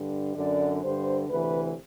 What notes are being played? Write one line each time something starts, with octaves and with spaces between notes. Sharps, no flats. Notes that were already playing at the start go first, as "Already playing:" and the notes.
Already playing: G2 D3
F#2 D3 D5
G2 D3 C5
D2 C3 E3 B4